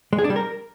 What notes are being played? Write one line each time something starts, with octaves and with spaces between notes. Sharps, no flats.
G#3
G#4
D4
G3
A#4